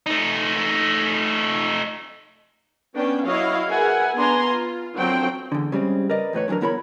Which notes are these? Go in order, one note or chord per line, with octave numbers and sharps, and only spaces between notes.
A3 D#4
B3 C#4 D4 G5
F#3 E4 C#5 D#5 F5
G#4 A#4 B4 E5 F#5 G#5
B3 D4 G#5 A#5 C6
F4
D3 F3 F#3 C4 C5 G5
E2 D3
C#3 G3 G#3 C4
A#4 B4 D5 D#5
E2 A2 B4 C#5
D3 E3 F#3 D4 A#4
E2 B3 E4 A#4 C#5 B5